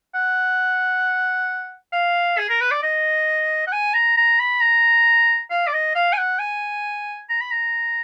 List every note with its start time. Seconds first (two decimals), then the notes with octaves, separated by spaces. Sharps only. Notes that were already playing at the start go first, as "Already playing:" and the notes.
0.15 F#5
1.93 F5
2.38 G#4
2.49 A#4
2.61 B4
2.72 D5
2.83 D#5
3.67 F#5
3.73 G#5
3.94 A#5
4.17 A#5
4.40 B5
4.61 A#5
5.51 F5
5.67 D5
5.73 D#5
5.96 F5
6.13 G#5
6.18 F#5
6.39 G#5
7.30 A#5
7.41 B5
7.51 A#5